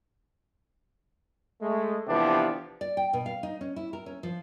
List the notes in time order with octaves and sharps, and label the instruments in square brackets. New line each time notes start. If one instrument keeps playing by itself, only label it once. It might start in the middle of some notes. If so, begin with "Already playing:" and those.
[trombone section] G#3 A3
C3 E3 F3 B3 D4 G4
[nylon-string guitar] D5
G5
B2
F5
D#4
C#4
E4
A#4
C#4
F3